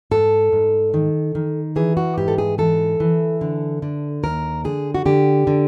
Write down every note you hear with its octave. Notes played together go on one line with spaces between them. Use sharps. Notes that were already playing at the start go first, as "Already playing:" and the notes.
G#2 A4
G#2
D#3
D#3
E3 G#4
F#4
G#2 G4
A4
G#4
E3 A4
E3
D3
D3
D#2 A#4
D3 G#4
F#4
D3 G4
D3